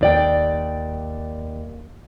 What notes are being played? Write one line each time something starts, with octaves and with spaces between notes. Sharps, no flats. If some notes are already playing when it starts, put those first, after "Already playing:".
D#2 D5 G5